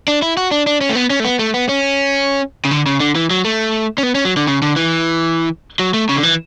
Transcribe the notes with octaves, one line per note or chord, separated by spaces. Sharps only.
D4
E4
F#4
D4
D4
C#4
A3
B3
C#4
A3
B3
A3
B3
C#4
C#3
D3
C#3
D3
E3
F#3
A3
C#4
B3
C#4
F#3
D3
C#3
D3
E3
F#3
A3
C#3
D3
E3